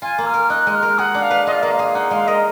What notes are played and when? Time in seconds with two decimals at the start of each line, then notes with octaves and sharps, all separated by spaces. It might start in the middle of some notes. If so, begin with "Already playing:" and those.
0.02 F4 G#5
0.18 A#3
0.26 F6
0.34 A#4
0.50 D#4 F#6
0.67 G#3
0.75 F6
0.82 A#4
0.98 G#4 F#5
1.15 D4
1.22 F5
1.31 B4
1.47 F4 D#5
1.54 F5
1.62 A#3 D#5
1.71 F5
1.79 G#4
1.95 D#4 F#5
2.11 G#3 F5
2.27 A#4 D#5